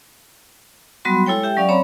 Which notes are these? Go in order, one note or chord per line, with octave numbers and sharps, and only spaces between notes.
F#3 G3 B3 F#4 B5 C6
G#3 E4 A4 C#5 G5
G4 E5 G5
F#3 C#4 D5 F5
C4 C#5 A#5 B5